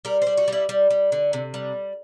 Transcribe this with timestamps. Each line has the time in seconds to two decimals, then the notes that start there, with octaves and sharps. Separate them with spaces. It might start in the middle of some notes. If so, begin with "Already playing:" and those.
0.05 G3 A#4
0.22 G3 C5
0.37 F#4
0.48 G3 E4
0.69 G3
0.90 G3
1.12 D3
1.33 C3
1.54 G3